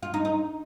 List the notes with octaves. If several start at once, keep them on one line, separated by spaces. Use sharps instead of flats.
F4
D#4
D#4